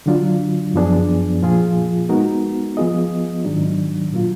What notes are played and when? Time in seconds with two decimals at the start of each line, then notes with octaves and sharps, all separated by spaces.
0.06 D3 F#3 D4 F4
0.74 F#2 F3 B3 D4 G#4
1.42 A#2 F3 A#3 F4 G#4
2.09 G#3 B3 D#4 F#4 A#4
2.77 F3 B3 F4 G#4 D#5
3.45 G#2 D#3 F#3 D4
4.13 A#2 F#3 A#3 F4